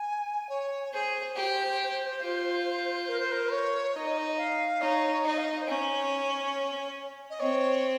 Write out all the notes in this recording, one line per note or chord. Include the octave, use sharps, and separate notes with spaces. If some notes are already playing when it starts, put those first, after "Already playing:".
Already playing: G#5
C#5
G#4 C5
G4
F4
A#4
C5
A#4
C#5
D#4 D#5
C#5
D#5
F5
D#4 C#5
D#4 D#5
F5
D#5
C5
C#4 C#5
D#5
C4 C#5